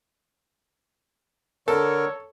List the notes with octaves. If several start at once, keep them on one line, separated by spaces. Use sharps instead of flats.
D3 A4 A#4 C#5